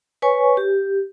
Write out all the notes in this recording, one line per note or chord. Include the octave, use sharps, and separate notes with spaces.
B4 C#5 G#5 C#6
G4